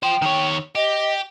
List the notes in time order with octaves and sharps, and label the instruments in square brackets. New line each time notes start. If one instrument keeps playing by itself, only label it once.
[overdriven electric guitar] F3 C5 [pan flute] G5
[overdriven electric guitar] D#3 C#5
[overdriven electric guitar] G4 [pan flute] D#5